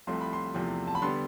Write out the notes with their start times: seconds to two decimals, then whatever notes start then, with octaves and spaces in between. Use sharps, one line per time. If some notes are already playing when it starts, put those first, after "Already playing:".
0.07 C2 C3 F3 A3 C6
0.21 B5
0.33 C6
0.54 E2 C3 F3 A3
0.88 A5
0.95 B5
1.02 D3 G3 B3 C6